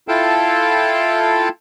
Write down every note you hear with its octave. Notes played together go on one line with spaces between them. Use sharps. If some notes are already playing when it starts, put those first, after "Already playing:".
E4 F4 A4 F5 G5 A5